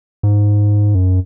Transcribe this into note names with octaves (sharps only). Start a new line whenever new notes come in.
G#2
F#2